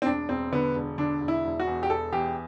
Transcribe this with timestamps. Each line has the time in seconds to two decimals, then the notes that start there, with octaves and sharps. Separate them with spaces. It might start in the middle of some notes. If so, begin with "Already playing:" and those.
0.02 C4
0.05 E1 D4
0.29 E1 C4
0.52 D3 B3
0.76 E1
0.98 D3 D4
1.21 E1
1.28 E4
1.44 E1
1.60 F#4
1.67 E2
1.83 G4
1.90 E1 A4
2.13 E2 G4